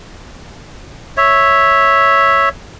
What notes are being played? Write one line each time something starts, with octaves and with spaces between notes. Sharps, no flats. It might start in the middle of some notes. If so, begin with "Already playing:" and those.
C#5 E5